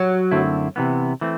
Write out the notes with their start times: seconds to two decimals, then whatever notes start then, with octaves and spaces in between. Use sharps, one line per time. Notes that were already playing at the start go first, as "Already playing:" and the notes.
Already playing: F#3
0.31 F#2 D3 A3 C4 E4
0.76 C3 E3 B3
1.21 E3 A3 C4